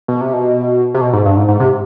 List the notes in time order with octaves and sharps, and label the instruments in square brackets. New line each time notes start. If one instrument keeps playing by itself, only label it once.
[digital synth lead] B2
C3
B2
C3
B2
G#2
G2
G#2
G#2
C3